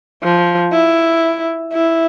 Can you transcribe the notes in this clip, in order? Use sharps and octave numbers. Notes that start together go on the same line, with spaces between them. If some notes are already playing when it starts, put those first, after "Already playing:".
F3
E4
E4